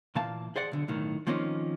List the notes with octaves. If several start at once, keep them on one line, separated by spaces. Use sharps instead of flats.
A#2 E3 A#3 F5 A5
G#4 C5 D5 F#5
B1 D3
B1 A2 D#3
D#3 F3 A#3 C4 C#4 D#4